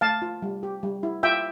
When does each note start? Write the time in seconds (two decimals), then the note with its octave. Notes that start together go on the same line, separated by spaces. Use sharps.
0.01 A3 F5 A5
0.22 F4
0.42 G3
0.63 G4
0.83 G3
1.03 E4
1.23 F4 E5 G5